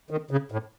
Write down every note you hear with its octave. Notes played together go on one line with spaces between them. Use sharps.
D#3
C#3
A2